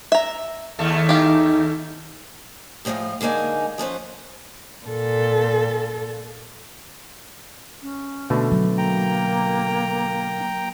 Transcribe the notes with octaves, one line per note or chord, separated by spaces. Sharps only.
E5 A#5
D#2 A3
D#4 G4 F5
A2 C3 F3 G#3 F5
D3 G#3 A#3 D#4 G#5
F3 C#4 B4 C5
A#2 A4
C#4
B2 D3 A3
F#3
A#3 G5 A#5